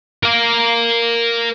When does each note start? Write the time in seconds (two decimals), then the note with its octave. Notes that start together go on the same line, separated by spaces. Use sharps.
0.23 A#4 F5